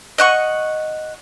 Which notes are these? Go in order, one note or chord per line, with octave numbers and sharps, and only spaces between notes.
D#5 F#5 C#6